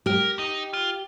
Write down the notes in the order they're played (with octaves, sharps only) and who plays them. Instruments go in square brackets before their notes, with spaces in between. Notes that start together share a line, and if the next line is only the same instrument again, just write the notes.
[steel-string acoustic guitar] G4 [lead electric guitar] A#4
[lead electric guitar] D#4
F4